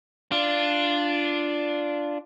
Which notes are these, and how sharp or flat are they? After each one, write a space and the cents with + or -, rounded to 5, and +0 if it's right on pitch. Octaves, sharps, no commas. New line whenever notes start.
D4 +0 F4 -10